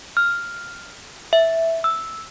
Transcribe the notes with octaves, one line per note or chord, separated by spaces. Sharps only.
F6
E5
E6